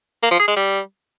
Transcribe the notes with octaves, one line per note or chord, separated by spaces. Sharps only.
A#3
F3
G#4
G#3
G3